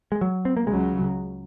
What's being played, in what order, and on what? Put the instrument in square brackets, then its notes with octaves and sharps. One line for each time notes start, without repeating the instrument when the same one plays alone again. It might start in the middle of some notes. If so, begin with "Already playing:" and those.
[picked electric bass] G#3
F#3
C4
A#3
[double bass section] C#2 C#3 F#3 [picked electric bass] G#3